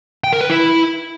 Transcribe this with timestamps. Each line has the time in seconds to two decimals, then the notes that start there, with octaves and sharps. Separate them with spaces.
0.24 G5
0.33 A#4
0.41 B4
0.50 E4